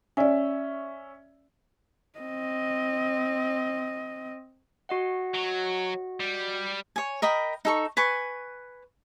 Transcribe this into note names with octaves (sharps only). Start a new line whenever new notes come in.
C#4 D5 E5 G#5
C4 D#5
F#4 D#5 F#5
F#3
G3
C#5 G#5
A#4 D#5 G5 B5
D#4 A4 C#6
B4 G#5 C#6